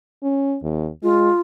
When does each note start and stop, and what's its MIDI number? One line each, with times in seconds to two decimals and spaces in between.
0.23 0.57 61
0.63 0.89 39
1.03 1.29 56
1.03 1.41 65